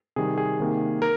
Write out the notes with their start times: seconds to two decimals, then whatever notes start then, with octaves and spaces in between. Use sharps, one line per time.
0.16 C3 D#3 G3 G#4
0.38 G#4
0.60 C3 D#3 A#3
1.02 A#4